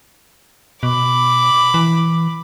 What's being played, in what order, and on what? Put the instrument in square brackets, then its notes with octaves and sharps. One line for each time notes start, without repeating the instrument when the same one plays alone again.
[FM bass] B2 [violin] B5 D6
[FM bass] E3